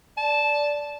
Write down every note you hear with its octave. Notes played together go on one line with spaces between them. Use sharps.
D5 A5